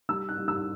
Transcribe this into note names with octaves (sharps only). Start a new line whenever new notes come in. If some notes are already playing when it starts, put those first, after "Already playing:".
G3 E6
F#6
G3
E6